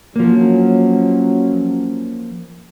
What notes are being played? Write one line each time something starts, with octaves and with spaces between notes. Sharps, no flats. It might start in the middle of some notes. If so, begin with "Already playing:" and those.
F3 F#3 A#3 C#4